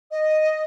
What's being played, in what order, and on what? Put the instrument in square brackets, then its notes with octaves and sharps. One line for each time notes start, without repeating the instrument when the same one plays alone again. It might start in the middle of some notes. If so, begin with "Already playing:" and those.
[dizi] D#5